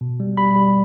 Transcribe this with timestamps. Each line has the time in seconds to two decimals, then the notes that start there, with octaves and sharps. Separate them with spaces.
0.01 B2
0.20 G3
0.37 G3 B5
0.56 G3